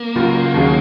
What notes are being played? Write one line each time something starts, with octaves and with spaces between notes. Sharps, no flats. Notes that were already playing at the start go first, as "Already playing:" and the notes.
Already playing: A#3
C#2 C#3 F#3 C#4 F4
D#2 D#3 F#3 C#4 G#4